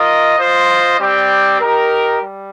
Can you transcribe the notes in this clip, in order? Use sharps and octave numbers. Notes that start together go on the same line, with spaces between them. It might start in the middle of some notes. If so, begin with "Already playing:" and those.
Already playing: F4 A#4 D#5
F4 C5 D#5
G3 C4 G4 D5 G5
D#4 G4 A#4
G3